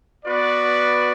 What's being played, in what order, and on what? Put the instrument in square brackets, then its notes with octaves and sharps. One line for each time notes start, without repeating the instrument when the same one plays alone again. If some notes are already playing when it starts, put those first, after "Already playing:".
[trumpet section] B3 F#4 B4 D5